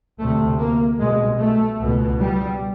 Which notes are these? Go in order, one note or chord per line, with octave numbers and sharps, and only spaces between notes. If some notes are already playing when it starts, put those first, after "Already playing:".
D2 C3 A3
A#3
C2 B2 G#3
A3
C#2 B2
G3